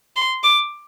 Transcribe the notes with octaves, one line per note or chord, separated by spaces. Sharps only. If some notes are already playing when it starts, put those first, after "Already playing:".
C6
D6